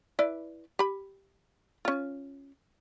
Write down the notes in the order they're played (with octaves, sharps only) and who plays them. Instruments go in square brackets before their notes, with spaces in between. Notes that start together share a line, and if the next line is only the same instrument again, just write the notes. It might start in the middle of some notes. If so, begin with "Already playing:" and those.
[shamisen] E4 B4 D5
G4 B5
C#4 F4